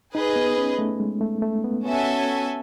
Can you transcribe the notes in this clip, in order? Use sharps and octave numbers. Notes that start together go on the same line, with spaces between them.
D#4 G#4 B4 D#5
B3
C#4
A3
G#3
A3
A3
B3
B3 C#4 F#4 A4 E5 G#5